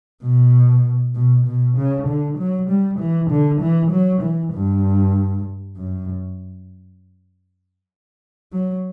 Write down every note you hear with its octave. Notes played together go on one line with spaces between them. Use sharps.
B2
B2
B2
C#3
D3
F#3
G3
E3
D3
E3
F#3
E3
G2
F#2
F#3